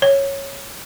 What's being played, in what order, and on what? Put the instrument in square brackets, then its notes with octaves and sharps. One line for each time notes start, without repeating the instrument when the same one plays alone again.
[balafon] C#5